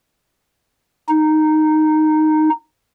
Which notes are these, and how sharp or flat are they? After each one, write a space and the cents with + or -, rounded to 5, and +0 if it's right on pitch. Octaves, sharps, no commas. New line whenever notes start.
D#4 -5